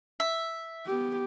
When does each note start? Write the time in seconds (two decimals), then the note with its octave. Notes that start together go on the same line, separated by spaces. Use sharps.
0.20 E5
0.86 B3 G4